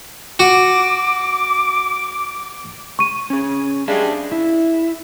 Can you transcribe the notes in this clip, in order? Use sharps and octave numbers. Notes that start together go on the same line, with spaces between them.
F#4 D6
C#6 D#7
C#4 G#4
G3 G#3 D4 E5 F5
E4